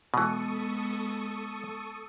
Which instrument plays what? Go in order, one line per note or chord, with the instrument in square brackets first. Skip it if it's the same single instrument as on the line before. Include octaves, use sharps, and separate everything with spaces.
[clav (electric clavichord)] B2 E3 [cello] G#3 B3 [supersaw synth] A4 C#6 D#6